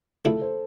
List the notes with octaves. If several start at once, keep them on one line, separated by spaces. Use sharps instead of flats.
C#3 F3 A3 C4 E4 A4
C5